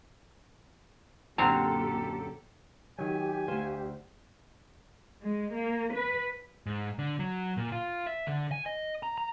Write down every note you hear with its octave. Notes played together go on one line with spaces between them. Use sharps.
F#2 A#2 D3 C4 F#4 G4 A4 A#5
D#3 F#3 G4 G#5
D2 C5 F5
G#3
A#3
B4
G#2
D3
F#3
A#2
F4
E5
D3
G#5
D#5
A#5
A#5